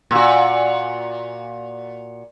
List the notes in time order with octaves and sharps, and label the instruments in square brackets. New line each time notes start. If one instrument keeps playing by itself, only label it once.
[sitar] A#2 F#4